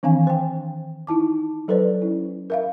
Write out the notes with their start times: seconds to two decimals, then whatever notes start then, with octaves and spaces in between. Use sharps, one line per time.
0.03 D#3 E3 C4 D4 F5 G#5
0.27 C5 G5
1.07 D#4 E4 A5 D6
1.68 F#3 A4 B4 C5 D5
2.02 C#4 E4
2.50 A#4 E5 F5